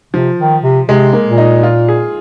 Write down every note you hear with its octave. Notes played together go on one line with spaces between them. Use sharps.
C3 F3
D#3
C3
C3 G#3
A#3
A#2
D#4
F4
G#4